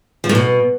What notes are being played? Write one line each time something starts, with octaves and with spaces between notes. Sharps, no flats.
F3
A2
B2